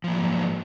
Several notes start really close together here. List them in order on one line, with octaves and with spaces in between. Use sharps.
F3 A#3 F#3 G#2